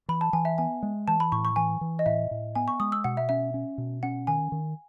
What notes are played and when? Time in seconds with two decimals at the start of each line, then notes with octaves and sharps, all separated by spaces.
0.08 E3 B5
0.21 A5
0.33 E3 G#5
0.45 E5
0.58 B3 G#5
0.83 G#3
1.08 E3 A5
1.20 B5
1.32 A2 C#6
1.45 C#6
1.56 E3 G#5
1.81 E3
1.99 D#5
2.06 A2 E5
2.31 A2
2.55 B3 G#5
2.68 C#6
2.80 G#3 D#6
2.92 E6
3.04 B2 F#5
3.17 E5
3.29 C#4 E5
3.54 C#4
3.78 B2
4.03 C#4 F#5
4.27 D#3 G#5
4.52 D#3